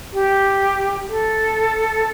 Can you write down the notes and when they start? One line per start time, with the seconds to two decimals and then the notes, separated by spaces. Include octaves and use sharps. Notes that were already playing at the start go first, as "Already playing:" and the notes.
0.13 G4
1.09 A4